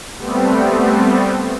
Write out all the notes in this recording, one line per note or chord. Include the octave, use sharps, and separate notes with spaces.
G3 A3 B3 C4